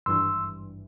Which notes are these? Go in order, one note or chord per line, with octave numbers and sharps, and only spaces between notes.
G#1 G2 E3 C6 E6